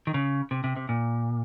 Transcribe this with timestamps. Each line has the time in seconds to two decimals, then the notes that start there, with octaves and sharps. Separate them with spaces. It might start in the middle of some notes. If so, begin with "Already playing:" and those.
0.07 D#3
0.14 C#3
0.51 C3
0.64 C3
0.76 C3
0.89 A#2